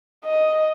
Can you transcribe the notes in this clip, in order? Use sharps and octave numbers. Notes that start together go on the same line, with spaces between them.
D#5